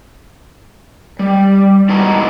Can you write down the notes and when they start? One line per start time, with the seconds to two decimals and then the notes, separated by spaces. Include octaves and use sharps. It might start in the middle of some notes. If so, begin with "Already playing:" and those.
1.19 G3
1.89 G#2 E3 B3 F#4 A5 A#5